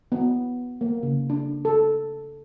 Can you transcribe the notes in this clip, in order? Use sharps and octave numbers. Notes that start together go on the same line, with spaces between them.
B3
A#3
C#3
D4
A4